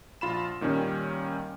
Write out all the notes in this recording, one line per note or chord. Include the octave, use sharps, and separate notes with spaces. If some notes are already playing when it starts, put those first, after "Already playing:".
A#1 F4 B5 E7
A#2 D#3 G3 C#4